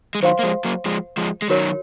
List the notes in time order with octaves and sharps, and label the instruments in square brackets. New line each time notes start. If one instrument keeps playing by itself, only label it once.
[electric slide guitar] G#3
[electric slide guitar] D#3 F#3 [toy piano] C5 F5 C6
[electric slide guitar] A#3
F3 G#3
F#3 A#3
F3 G#3
F3 G#3
G#3
[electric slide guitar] D#3 F#3 [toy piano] F#4 A#4 C#5